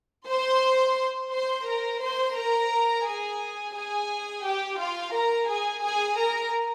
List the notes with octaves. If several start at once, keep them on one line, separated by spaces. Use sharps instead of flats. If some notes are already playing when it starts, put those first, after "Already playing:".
C5 C6
C5 C6
A#4 A#5
C5 C6
A#4 A#5
G#4 G#5
G#4 G#5
G4 G5
F4 F5
A#4 A#5
G#4 G#5
G#4 G#5
A#4 A#5